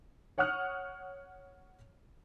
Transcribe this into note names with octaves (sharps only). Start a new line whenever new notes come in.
C#5 F#5 C#6 D#6 F6 F#6